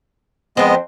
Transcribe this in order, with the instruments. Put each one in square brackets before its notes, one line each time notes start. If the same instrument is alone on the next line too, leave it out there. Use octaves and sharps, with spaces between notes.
[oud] F2 C4 [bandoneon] G#3 B3 D#5